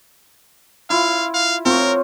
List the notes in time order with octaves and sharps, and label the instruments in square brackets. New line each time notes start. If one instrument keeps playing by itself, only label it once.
[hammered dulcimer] E4 F4 [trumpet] F5
[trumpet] F5
[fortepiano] C4 [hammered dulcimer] F4 C#5 [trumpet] A#4